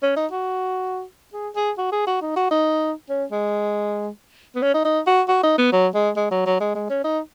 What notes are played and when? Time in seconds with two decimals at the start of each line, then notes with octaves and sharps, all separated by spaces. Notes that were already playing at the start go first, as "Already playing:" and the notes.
0.02 C#4
0.16 D#4
0.31 F#4
1.34 G#4
1.56 G#4
1.78 F#4
1.92 G#4
2.07 F#4
2.22 D#4
2.36 F#4
2.51 D#4
3.10 C#4
3.32 G#3
4.55 B3
4.62 C#4
4.74 D#4
4.85 D#4
5.07 F#4
5.28 F#4
5.43 D#4
5.58 B3
5.73 F#3
5.95 G#3
6.17 G#3
6.31 F#3
6.46 F#3
6.61 G#3
6.75 G#3
6.90 C#4
7.04 D#4